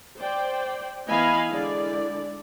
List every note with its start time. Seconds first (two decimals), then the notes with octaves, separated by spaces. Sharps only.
0.18 C5 D5 G5
1.08 E3 B3 D#5 F5 G#5 B5
1.50 D3 G#3 E4 D5